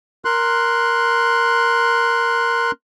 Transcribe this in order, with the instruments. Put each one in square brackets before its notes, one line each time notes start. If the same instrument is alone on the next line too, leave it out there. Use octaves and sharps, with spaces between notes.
[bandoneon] A#4 C6 F#6